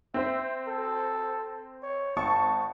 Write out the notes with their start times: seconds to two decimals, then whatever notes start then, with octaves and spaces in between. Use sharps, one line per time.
0.14 C4 C5 E5
0.67 A4
1.83 C#5
2.17 G#1 A5 C#6